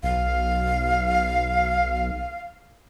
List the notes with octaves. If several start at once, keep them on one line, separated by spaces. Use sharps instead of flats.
B1 F5